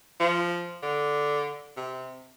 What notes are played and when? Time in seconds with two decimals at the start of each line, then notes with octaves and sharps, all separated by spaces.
0.20 F3
0.82 D3
1.76 C3